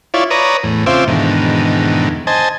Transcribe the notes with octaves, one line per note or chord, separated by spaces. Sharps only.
E4 F4 C#5 D5
B4 C#5 D5 A#5 D#6
E2 A2
C#3 C4 F4 C5 E5 D6
E2 G#2 B2 D3 D#3
C5 D#5 G#5 A5